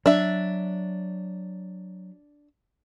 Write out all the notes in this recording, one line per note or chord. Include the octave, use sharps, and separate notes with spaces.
F#3 D4 E5